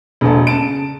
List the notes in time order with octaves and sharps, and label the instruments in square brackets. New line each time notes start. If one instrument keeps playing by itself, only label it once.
[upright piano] E1 A#1 A4
C#3 A5 D7